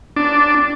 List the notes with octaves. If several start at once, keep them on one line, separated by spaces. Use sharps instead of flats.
D4